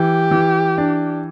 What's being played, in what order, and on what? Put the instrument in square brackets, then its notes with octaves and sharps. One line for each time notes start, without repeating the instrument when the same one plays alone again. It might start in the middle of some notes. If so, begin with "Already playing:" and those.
Already playing: [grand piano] E3 [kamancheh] G4
[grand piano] E3
D4